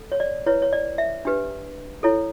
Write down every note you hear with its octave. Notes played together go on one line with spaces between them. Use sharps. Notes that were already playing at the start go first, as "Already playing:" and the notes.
Already playing: A4
C#5
D5
E4 B4 C#5
C#5
D5
E5
D4 G4 B4
E4 A4 C#5